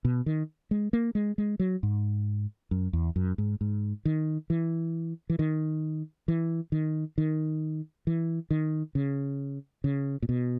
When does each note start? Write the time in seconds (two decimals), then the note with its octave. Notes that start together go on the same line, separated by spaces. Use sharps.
0.05 B2
0.26 D#3
0.71 G#3
0.93 A#3
1.15 G#3
1.38 G#3
1.60 F#3
1.83 G#2
2.71 F#2
2.93 E2
3.16 F#2
3.38 G#2
3.61 G#2
4.05 D#3
4.50 E3
5.30 E3
5.39 D#3
6.28 E3
6.72 D#3
7.18 D#3
8.07 E3
8.51 D#3
8.95 C#3
9.84 C#3
10.22 A#2
10.29 B2